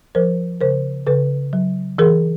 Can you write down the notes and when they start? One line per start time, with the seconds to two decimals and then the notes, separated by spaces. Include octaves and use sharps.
0.15 F3 A#4 C5
0.61 C#3 A#4 C5
1.07 C#3 A4 B4
1.53 F#3
1.98 E3 G#4 A#4